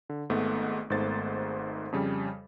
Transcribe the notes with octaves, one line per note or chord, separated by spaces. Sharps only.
D3
G#1 G#2 A3 B3
G#1 G#2 A3 B3 C5 A6
F2 C#3 G3